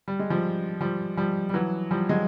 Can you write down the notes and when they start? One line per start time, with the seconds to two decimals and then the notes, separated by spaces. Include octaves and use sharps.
0.08 G3
0.19 G#3
0.30 F3 G3
0.81 F3 G3
1.17 F3 G3
1.49 G3
1.54 E3 F#3
1.91 F3 G3
2.09 F#3 G#3